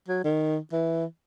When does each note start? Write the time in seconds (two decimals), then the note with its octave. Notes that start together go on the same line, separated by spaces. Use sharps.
0.08 F#3
0.24 D#3
0.72 E3